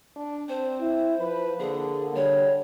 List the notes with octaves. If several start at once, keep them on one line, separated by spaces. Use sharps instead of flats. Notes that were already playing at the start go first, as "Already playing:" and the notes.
D4
C4 C5
E4
F3 B4
D3 A#3 G#4
D3 G3 C#5